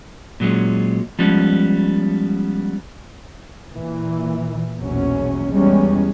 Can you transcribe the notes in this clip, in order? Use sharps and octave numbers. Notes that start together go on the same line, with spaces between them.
A#2 F#3 G#3 C#4
F3 G3 G#3 B3 C#4
A#2 E3
A#1 E2 B2 F#3 C#4
E2 G3 G#3 C#4